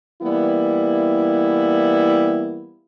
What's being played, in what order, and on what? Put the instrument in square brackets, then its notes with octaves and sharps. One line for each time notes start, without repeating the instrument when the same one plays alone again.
[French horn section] E3 G3 A#3 B3 E4